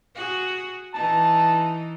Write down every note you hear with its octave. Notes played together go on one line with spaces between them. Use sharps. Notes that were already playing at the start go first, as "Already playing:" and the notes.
F#4 G#4
E3 D#4 A5